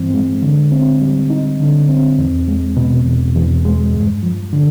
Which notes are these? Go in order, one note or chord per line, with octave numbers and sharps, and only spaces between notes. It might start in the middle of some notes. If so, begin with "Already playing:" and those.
Already playing: G2 E3 C4
G#3
D3
C4
G3
D#4
D3
C4
E2
G#3
B2
E2
E2
G#3
G2
F3
D3